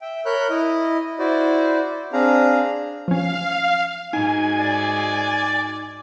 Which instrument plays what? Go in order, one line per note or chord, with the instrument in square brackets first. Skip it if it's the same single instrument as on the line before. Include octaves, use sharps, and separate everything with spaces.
[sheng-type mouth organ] E5 G5
A#4 C#5 B5 F#6 G6
E4 D#5
E4 F#4 C5 D5
C4 D4 G#4 F5 A#5
[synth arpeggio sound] F3 C#4 [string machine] F5
[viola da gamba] G#2 F#4 [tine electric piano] D#4 [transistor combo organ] G#5
[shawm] D5